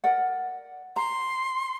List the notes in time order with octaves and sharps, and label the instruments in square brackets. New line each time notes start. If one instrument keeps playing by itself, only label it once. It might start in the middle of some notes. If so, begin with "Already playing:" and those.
[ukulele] A#4 D5 F#5
[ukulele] A#5 [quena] C6